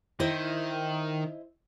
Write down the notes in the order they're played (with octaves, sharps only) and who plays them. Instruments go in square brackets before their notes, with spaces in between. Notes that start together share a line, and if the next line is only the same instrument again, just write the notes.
[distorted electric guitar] D#3 [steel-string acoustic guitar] E4 C5 D#5